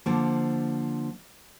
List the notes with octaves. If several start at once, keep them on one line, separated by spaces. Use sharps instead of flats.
D3 F3 A#3